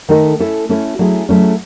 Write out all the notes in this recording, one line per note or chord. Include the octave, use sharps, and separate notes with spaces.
D#3 A3 D#4 A4 D#5
A3 C#4 E4 A4
A3 C#4 E4 A4
F#3 A3 C#4 E4 G#4
F#3 A3 C#4 E4 G#4